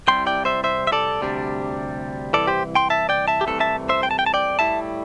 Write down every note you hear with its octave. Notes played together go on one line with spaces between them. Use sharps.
C2 C3 G3 E4 G5 C6
D5 G5
C5 E5
C5 E5
E5
A4 D5
D2 C3 G3 D4
C2 C3 E3 A4 D5
G4 C5
G5 C6
E5 A5
D5 G5
E5 A5
G4
C2 C3 E3 A3 A4
E5 A5
C5 E5
G5
A5
G5
A5
D5 G5
A2 G3 E4 E5 A5